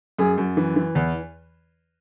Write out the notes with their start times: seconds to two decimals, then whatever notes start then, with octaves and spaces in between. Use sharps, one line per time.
0.19 F#2 G#4
0.38 F#2
0.57 E3
0.76 E3
0.95 E2